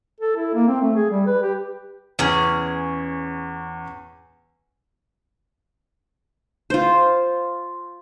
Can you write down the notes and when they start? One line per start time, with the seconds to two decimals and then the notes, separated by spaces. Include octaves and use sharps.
0.20 A4
0.36 E4
0.54 A#3
0.68 C4
0.81 A3
0.96 G#4
1.10 G3
1.27 B4
1.43 G4
2.19 E2 C#4 G#4
6.70 F4 C5